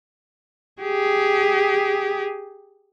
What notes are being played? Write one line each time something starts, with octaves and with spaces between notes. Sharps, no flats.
G4 G#4